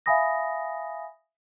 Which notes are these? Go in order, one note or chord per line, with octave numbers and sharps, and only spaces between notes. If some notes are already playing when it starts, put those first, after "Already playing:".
E5 F5 G#5 B5 D#6 A#6